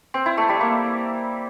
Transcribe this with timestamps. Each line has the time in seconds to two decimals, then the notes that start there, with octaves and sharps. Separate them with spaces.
0.14 C4
0.26 E4
0.37 A3
0.49 G3
0.61 A#3